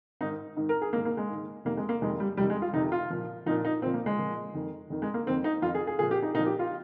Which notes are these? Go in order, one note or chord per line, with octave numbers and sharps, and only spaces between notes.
G#2 D#3 D#4
G#2 D#3
A#4
G#4
G#2 D#3 A#3
A#3
G#3
G#2 D#3
F2 C3 D#3 A#3
G#3
A#3
F2 C3 D#3 G#3
G3
F2 C3 D#3 G3
G#3
F4
F2 C3 D#3 D#4
F4
A#2 F3
A#2 F3 D#4
D#4
A#2 F3 C4
A#3
G#3
A#2 F3
F2 D#3
F2 D#3
G#3
A#3
F2 D#3 C4
D#4
F2 D#3 F4
G#4
G#4
A#2 F3 G#4
G4
D#4
A#2 F3 D#4
G4
F4